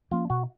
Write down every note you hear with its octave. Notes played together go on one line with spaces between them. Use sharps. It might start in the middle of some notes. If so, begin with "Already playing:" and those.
F3 A#3 C#4 F4
B2 F#4